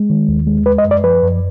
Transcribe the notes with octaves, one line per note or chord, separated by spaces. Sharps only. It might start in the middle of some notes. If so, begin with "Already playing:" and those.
Already playing: G#3
D#3
D#2
G#3
G#3 B4
D#5
F#2
D5
F3 B4
F#2